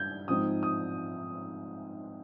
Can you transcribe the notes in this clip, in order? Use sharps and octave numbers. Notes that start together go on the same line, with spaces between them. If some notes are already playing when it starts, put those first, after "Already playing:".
Already playing: G2 G6 G#6
G#2 F3 C4 D#4 D#6
D#6